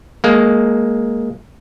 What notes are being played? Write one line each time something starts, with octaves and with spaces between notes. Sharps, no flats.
G#3 A#3